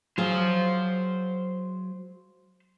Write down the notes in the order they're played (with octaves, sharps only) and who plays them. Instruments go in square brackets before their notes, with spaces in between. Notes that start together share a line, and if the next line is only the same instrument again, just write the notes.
[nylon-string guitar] F#3 G#4 [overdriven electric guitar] C5 F5